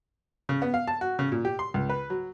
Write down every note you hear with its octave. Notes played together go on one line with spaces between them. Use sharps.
C#3
B3
F5
A5
F#4
C#3
A#2
G4
C6
C#2
B4
F#3